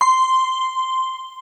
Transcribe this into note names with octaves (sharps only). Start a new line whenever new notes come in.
C6